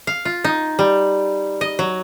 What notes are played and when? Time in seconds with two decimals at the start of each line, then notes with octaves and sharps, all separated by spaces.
0.07 F5
0.25 F4
0.44 D#4
0.79 G3
1.61 D#5
1.79 F#3